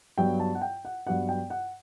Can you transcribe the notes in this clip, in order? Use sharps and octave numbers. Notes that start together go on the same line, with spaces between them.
G2 F#3 B3 G5
A5
F#5
G5
F#5
G2 F#3 B3 F#5
G5
F#5